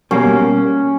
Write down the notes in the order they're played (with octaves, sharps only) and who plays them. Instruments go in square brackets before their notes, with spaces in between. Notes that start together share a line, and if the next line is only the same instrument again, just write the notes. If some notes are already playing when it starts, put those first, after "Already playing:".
[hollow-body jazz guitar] B2 G3 A#3 [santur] C#4